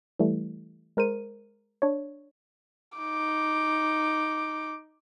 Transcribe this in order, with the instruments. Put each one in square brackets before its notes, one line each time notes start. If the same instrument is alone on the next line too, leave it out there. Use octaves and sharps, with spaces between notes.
[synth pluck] E3 G3 A3
G#3 A#4 C5 D#7
D4 C#5
[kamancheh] D#4 D6